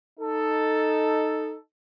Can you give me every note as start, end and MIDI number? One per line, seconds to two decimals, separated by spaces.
0.20 1.56 63
0.20 1.56 69